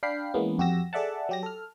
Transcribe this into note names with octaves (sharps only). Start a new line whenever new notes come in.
D4 F5 G5 B5 C7
E3 G#3 A#3 B3 C#4
F2 F#4 G4 E6 A#6
G#4 A4 D5 E5 F#5 A5
F#3 G4 A#6
A4 F6